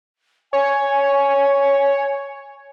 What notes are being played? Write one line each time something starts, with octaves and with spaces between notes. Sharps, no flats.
C#5 G#5